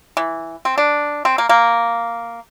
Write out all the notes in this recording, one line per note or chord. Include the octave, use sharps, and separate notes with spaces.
E3
C4
D4
C4
A#3
A#3